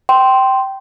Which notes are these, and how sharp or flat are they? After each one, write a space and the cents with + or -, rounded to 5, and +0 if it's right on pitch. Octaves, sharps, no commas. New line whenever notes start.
G5 -15 C6 +0